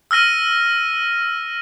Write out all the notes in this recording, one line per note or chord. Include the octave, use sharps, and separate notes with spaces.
E6 F6 A#6 D#7